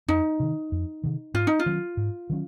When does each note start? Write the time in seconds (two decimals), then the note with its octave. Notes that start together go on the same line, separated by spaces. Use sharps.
0.08 F2 D#4
0.40 C3 D#3
0.72 F2
1.04 C3 D#3
1.34 G#2 F4
1.47 D#4
1.60 F4
1.66 D#3 F#3 C#4
1.97 G#2
2.30 D#3 F#3 C#4